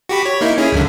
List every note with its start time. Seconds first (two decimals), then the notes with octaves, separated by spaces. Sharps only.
0.09 F#4 G4 B5
0.26 C#5
0.41 A#3 D#4 E4
0.58 C#4 E4 G#4
0.72 C#2 F#2 D3